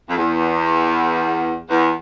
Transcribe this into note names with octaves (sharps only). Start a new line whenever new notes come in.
F2
E2
E2